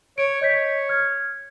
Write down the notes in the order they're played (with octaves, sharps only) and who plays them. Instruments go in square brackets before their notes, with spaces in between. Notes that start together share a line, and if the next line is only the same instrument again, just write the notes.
[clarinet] C#5 [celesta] D7
[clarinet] C#5 [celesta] D#5 G6 B6
[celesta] F6 G#6